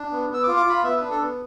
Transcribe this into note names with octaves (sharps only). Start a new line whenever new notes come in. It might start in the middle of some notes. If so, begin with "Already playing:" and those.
Already playing: D4
B3
B3 E6
F4 D6
D6
F4 B5
B3 E5
D4 B4
A4
B3